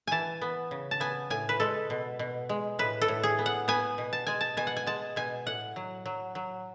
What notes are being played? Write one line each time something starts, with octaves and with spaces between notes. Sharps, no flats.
E3 G#5 A5
B3
C#3
A5
B3 G#5
A2 G#5
B4
G#3 A4
B2
B2
G#3
A2 B4
A4
A2
G#4
B3
F#5
B3 G#5
B2
A5
G#3 G#5
A5
B2 G#5
F#5
G#5
G#3 A5
B2 G#5
A2 F#5
F#3
F#3
F#3